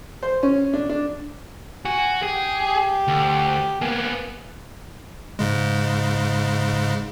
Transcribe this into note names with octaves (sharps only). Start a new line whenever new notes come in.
C5
C#4
D4
D4
F#4 G#5
G4 G#4
D2
A#3 B3 G#5
G#2 C#3 G#3